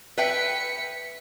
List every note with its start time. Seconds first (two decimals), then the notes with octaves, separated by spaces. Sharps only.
0.18 B4 E5 G5 B6 C#7